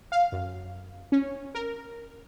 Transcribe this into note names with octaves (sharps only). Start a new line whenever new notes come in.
F5
F#2
C#4
A#4